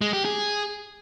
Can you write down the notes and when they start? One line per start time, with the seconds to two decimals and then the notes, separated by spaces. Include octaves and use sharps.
0.01 G#3
0.13 G4
0.25 G#4